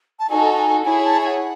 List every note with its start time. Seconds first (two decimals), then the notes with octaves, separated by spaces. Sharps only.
0.20 A5
0.30 D#4 F#4 A4 G#5
0.58 G#5
0.85 E4 G#4 C#5 G#5
1.04 A5
1.22 G#5
1.27 F#5